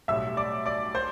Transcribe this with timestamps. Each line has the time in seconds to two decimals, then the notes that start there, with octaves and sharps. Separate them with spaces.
0.08 B1 A2 G3 E5 E6
0.37 D5 D6
0.66 D5 D6
0.95 C5 C6